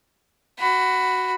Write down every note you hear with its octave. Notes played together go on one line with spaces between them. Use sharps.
F#4 B5